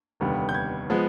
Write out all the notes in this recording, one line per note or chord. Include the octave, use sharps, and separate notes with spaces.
F1 D#2 D3 G3 B3
G6
G#6
F3 G#3 B3